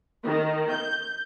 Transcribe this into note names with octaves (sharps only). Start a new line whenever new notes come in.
D#3
G6